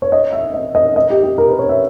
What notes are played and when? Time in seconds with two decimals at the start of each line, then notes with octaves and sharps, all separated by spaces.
0.02 C#5
0.12 D#5
0.33 E5
0.54 D#5
0.75 D#5
0.96 D#5
1.10 G4
1.23 G4
1.38 A#4
1.49 B4
1.59 C#5
1.69 E5